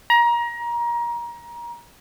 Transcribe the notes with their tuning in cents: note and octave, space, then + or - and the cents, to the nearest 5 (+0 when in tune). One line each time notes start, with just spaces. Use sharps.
A#5 +25